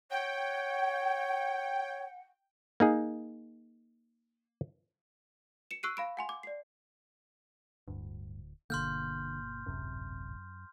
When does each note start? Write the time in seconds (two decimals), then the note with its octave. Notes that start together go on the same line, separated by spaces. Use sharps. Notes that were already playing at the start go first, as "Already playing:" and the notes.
0.10 C#5 F#5 G5
2.80 A#3 D#4 G#4
5.71 C#7 E7
5.83 C#6 E6 F#6 C7 D7 D#7
5.97 F5 B5 D7
6.17 F#5 G#5 C6
6.29 D6
6.43 D5 C7
7.88 D1 D2 G2
8.70 G1 B2 D3 A#3 C6 F6 G6
9.66 D1 G#1 F#2 C3